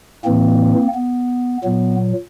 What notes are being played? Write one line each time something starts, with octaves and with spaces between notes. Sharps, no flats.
A2 E3 A#3 C4
B3
A#2 F#3 B3